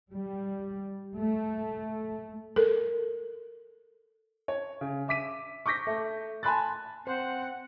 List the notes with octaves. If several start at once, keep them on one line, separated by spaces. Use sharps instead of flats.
G3
A3
A4 A#4
C#5
C#3
E5 D6 B6 D#7
C#6 D6 G6 A#6 B6
A3
G#5 A5 B5 C6 F#6 A6
C4 C5 F#5